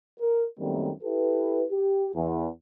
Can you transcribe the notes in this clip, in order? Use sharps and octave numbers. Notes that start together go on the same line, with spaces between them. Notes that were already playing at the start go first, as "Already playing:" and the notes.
A#4
F#2 D#3 G3 A3 A#3 C4
E4 G4 A4 B4
G4
E2